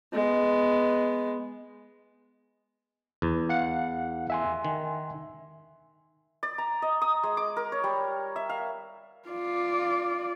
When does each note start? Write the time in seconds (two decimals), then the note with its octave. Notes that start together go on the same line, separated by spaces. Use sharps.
0.13 G#3 B3
3.22 E2
3.49 F5 F#5 C#7
4.30 E5 G#5 C6
4.65 D#3
6.43 D5
6.58 A#5
6.82 D#5
7.02 D#6
7.23 G#3
7.37 D6
7.57 A#4
7.72 C#5
7.84 G3
8.36 E5
8.49 F5
9.29 F4 D5